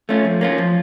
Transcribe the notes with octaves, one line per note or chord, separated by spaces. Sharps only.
A3 C#4 F4
F3
A#3 C#4 F4
F3